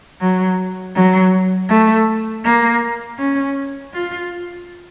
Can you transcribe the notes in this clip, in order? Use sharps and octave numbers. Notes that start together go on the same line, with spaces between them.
F#3
F#3
A3
A#3
C#4
F4